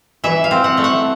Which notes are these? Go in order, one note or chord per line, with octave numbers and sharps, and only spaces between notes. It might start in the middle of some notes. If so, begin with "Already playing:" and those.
E3 E5
F5
C4
F#5
A3
F#5